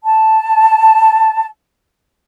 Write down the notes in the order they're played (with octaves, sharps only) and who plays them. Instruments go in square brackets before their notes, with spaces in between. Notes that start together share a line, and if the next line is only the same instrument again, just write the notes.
[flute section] A5